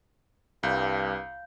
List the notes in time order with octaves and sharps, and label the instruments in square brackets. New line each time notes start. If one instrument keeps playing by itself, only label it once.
[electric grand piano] C2 [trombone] G2 [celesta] F5 G6